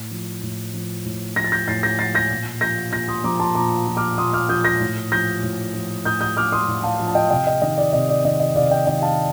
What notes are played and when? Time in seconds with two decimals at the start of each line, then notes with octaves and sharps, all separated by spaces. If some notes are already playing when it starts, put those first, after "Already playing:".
Already playing: A2
0.11 F3
0.43 A2
0.74 F3
1.05 A2
1.36 F3 A#6
1.44 A6
1.52 G6 A#6
1.68 A2 A6 C7
1.83 G6 A#6
1.99 F3 A6 C7
2.15 G6 A#6
2.30 A#2
2.61 F3 G6 A#6
2.92 A#2 G6 A#6
3.08 C6 D#6
3.24 F3 A#5 D6
3.40 A5 C6
3.55 A#2 A#5 D6
3.87 F3
3.97 D6 F6
4.18 A#2 C6 D#6
4.33 D6 F6
4.49 F3 D#6 G6
4.64 G6 A#6
4.80 A2
5.12 F3 G6 A#6
5.43 A2
5.74 F3
6.05 A2 D#6 G6
6.21 D#6 G6
6.37 F3 D6 F6
6.52 C6 D#6
6.68 A2
6.83 F5 A5
7.00 F3
7.07 A5
7.15 D#5 G5
7.30 C3 D#5 G5
7.47 D#5
7.62 D#3 D#5
7.78 D5
7.93 C3 D#5
8.09 D5
8.25 D#3 D#5
8.40 D#5
8.56 C3 D5 F5
8.71 D#5 G5
8.87 D#3 D#5 G5
8.98 G5
9.02 F5 A5